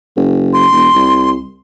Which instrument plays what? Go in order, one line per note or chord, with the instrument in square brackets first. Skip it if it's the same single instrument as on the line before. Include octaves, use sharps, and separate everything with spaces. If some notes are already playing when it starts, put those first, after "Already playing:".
[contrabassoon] F#1
[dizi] C6
[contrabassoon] E1
C2